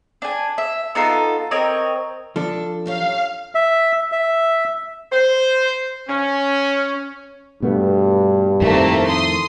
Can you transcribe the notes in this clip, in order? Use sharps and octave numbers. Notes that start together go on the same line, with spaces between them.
D4 G#5
E5
B3 D#4 F4 A4
C4 A#4 C#5 D#5
F3 D4 A4
F#2 G4 C#5 F5
E5
E5
C5
C#4
G2 B2 A3 B3
F2 A2 D#3 A3 A#3 C4
C6 D#6